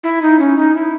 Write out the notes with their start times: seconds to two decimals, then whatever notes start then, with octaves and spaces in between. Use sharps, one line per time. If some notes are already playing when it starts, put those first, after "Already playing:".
0.04 E4
0.22 D#4
0.39 C#4
0.57 D#4
0.75 E4